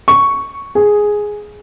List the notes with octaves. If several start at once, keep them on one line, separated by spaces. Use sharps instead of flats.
C#6
G#4